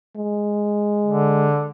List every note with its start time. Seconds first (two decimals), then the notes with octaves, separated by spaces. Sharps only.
0.16 G#3
1.06 D3